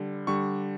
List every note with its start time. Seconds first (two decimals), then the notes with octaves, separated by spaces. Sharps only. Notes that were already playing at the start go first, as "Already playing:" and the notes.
Already playing: D3 G3
0.27 D3 G3 C#6